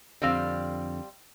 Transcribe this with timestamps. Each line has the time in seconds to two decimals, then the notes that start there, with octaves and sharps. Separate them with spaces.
0.22 F2 D3 G3 C4 F5